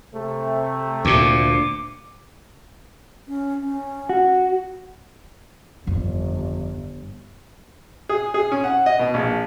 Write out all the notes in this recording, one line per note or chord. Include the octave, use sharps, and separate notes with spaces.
C3 A3
D2 A#2 D6
C#4
C#4
F#4
G1 F2 D#3
G#4
G#4
C#4
F#5
D#5
B2
A#1